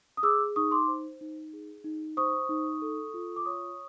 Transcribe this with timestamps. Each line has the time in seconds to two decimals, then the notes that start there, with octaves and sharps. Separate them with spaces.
0.17 D#6
0.23 G#4 D6 E6
0.56 D#4 C#6 D#6
0.71 C6 D6
0.88 C5
1.21 D#4
1.53 G#4
1.84 D#4
2.17 C5 C#6 D#6
2.49 D#4
2.82 A4
3.14 F4
3.36 D6
3.45 C#5 C#6 D#6